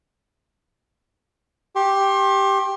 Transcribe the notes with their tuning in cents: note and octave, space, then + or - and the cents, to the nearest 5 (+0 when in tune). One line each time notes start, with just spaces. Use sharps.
G4 +0 C6 +35